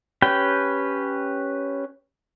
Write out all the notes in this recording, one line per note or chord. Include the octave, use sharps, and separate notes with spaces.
C#4 G4 B4 G5